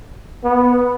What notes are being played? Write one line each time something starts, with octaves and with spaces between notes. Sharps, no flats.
B3